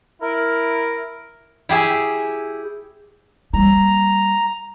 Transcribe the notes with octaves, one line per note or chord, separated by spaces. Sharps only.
E4 A#4
E4 G4 G#4 E5
G3 A#3 A#5